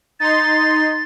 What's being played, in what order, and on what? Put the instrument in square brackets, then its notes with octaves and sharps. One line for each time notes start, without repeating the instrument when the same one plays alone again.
[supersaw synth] D#4 C6 [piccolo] A6